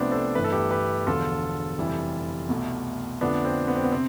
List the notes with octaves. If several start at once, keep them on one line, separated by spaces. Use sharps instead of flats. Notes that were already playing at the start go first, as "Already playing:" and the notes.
Already playing: C2 C3 F3 A3 B3 C4 D4
A4 C5
G1 G2 E3 A3 B4
A4
G4 B4
G4 B4
E1 E2 D3 F3 F4 A4
F1 F2 E3 G3
C2 B2 A3
F2 D3 F3 A3 B3 D4
C4
B3
C4
B3
C3 C4